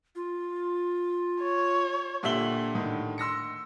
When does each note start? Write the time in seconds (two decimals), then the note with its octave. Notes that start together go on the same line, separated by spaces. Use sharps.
0.15 F4
1.42 C#5
2.23 A#2 D3 G4 E5 F#7 G7
2.74 A2 D3 D#3
3.18 C6 E6 A#6 C#7